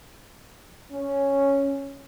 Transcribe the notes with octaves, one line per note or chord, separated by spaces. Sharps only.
C#4